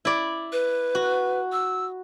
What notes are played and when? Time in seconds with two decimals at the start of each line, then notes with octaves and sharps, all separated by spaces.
0.05 E4 D5
0.52 B4
0.95 F#4
1.52 E6